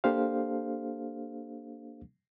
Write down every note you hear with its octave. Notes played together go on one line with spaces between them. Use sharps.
A#3 D4 G4 A4 C5 F5